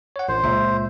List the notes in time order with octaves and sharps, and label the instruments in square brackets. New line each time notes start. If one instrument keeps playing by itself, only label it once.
[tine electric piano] C#5 F#5
[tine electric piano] A1 [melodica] C5
[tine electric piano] C#2 A#2 E5